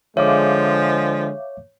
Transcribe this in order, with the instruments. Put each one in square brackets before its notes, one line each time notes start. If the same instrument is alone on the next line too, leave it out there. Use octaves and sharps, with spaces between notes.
[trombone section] D3 G#3 [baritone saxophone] F3 [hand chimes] C#5 [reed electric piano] E5 F5 D6